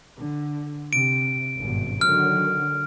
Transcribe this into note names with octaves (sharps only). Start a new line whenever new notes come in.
D3
C3 D7
G#1 G2 B2
D3 D#3 F#3 F6